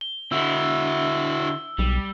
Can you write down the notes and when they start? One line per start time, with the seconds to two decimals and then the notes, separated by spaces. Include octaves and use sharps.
0.01 G7
0.32 D3 E4 F#4 E6
1.78 B1 G3